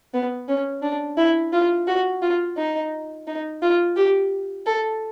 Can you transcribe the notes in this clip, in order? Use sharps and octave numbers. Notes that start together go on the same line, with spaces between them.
B3
C#4
D4
E4
F4
F#4
F4
D#4
D#4
F4
G4
A4